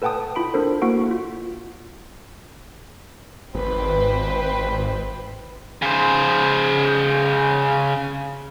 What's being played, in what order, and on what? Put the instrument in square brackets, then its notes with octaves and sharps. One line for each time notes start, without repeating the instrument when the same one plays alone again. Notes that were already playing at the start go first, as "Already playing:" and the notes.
[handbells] A4 B4 F#5 G5 A5 D#6
E4 F4 B5 D7
D4 A4 A#4 C5
A#3 E4 F#4 F#5 C#6 D7
F4
[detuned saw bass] G#1 [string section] B4 C5 G5
[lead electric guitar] C#3 C5